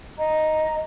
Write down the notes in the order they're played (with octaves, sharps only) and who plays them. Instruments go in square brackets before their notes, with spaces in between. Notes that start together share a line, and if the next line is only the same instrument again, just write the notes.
[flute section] D#5 A#5